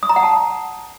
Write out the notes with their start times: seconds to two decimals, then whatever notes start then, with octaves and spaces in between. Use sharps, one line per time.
0.03 D#6
0.09 A#5
0.16 F#5
0.23 A5